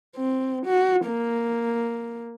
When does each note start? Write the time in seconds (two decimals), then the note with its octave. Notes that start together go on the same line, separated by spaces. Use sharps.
0.16 C4
0.66 F#4
1.06 A#3